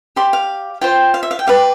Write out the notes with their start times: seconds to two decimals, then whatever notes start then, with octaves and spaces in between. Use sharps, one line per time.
0.16 G4 D5 C6
0.33 F5
0.81 F4 C5 G5
1.14 F5
1.23 E5
1.31 F5
1.39 G5
1.47 G4 B4 D5 F5